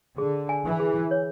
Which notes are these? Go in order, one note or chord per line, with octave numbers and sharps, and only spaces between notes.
D3 G#4
G#5
E3
G#4
C#5